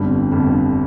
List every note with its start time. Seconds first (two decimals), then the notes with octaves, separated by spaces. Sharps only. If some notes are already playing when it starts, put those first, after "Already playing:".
Already playing: G1 F2 D3 G3
0.32 G1 F2 D3 G3